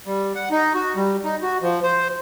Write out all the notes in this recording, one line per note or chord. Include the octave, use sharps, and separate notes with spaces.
G3
F#5
D#4
F#4
G3
D#4
F#4
F3
C5